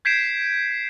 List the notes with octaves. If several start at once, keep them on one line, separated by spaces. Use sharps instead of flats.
G6 G#6 B6 C7 D7 E7